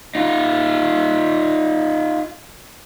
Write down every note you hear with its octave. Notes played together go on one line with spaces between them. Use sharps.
D#4 F4